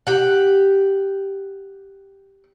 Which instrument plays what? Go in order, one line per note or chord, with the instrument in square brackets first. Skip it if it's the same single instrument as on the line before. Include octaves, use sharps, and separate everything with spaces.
[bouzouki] G4 F#5